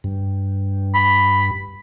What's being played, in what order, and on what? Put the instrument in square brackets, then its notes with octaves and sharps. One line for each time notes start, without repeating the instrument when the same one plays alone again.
[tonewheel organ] G2
[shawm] B5